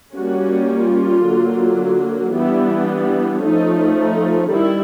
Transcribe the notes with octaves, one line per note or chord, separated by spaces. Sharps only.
G3 A#3 C#4 F#4
F4
D3 F#3 A#3
E3 G3 B3 D4 E4
F3 A3 C#4 D#4
D#4
D#3 G3 E4